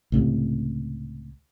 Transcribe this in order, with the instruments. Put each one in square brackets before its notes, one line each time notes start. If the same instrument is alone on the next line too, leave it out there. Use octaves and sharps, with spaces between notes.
[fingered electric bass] C#2 A2 C3